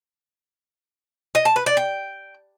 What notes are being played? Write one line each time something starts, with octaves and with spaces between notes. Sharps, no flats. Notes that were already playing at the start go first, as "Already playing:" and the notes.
D#5
A5
B4
D5
G5